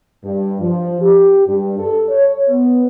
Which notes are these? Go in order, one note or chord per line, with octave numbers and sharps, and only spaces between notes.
G2
F3
G4
G2
A4
C#5
B3